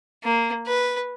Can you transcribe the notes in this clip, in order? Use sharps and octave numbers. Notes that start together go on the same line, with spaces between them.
A#3
B4